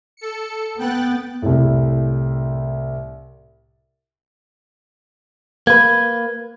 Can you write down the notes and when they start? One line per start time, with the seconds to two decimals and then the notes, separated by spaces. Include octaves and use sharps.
0.17 A4 C#7
0.79 B3 G5 F#6 A6
1.42 C2 A2
5.67 A#3 B4 G#6